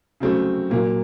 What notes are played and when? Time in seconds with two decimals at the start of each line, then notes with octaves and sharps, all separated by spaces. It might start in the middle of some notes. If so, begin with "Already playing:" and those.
0.20 C#3 F#3 A3 C4
0.70 A#2 F#3 A#3